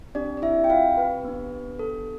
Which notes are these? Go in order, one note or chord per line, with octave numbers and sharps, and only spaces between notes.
C4 D4 G4 D5
D5
E4 E5
G5
F4 F5
B4
B3 D4 G4
A4